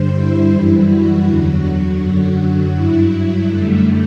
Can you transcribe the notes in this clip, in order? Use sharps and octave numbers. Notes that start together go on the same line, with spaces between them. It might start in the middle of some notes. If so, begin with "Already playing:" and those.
Already playing: G2 D3 G3 C5
E4
F#2 E3 G3
F#4
E2 D3 F#3 F#4
F#2 D3 F#3
G2 F#3 E4
F#2 D3 G3 A3